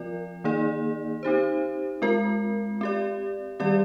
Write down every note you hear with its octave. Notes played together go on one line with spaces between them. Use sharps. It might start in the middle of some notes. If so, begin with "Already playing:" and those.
Already playing: F3 C4 F4 A#4 D5
D#3 A#3 D#4 G#4 D5
C4 D#4 G4 C5
G#3 C4 F4 A#4
C4 G4 D5
D#3 G3 C4 G4 D5